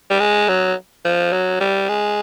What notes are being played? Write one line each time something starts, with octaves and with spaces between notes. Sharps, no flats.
G3
G#3
F#3
F3
F#3
G3
G#3